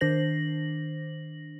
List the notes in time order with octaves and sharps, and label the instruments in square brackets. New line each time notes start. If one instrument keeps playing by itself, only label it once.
[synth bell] D#3 D4 C5 A#6 F#7